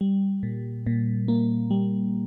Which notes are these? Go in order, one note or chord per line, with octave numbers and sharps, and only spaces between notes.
G3
A#2
A#2
A#3
G3